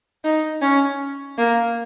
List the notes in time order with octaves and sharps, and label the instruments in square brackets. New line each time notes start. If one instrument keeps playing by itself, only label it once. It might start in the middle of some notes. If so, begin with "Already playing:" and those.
[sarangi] D#4
C#4
A#3